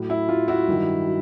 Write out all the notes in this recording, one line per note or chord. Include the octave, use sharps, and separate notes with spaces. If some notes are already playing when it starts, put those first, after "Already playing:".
Already playing: A2 F#3
E4
A2 F#3 F4
E4 F#4
G2 D#3 F#3
F#3